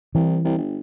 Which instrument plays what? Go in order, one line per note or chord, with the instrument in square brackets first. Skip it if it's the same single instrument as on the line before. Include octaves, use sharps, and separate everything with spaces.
[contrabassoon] C2 [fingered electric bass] E3
[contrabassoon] C2
G1